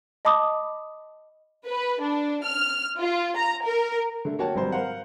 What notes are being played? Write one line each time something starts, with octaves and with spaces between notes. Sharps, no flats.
D#5 A5 B5 D6 D#6
B4
D4
F6
F4
A#5
A#4
D3 A3
A#3 F#4 C#5 G5 A5
G#1 F#3 G3 C5
A#4 C5 F5 F#5